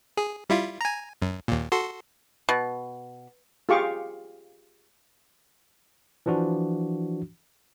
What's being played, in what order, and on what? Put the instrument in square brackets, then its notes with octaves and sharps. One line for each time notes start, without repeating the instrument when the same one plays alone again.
[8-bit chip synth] G#4
G3 E4 F4
G#5 A#5
F#2
D#2 A#2
F#4 A4 C6
[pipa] B2
[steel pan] F4 G4 G#4 F5 C#6 D6
[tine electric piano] E3 F3 D4 F#4